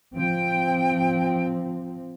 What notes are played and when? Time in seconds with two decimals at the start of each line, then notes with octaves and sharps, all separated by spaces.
0.13 F3 C4 G5